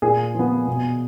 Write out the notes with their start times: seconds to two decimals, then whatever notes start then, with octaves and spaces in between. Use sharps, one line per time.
0.02 A#2 G#4
0.35 F3 B3
0.67 B2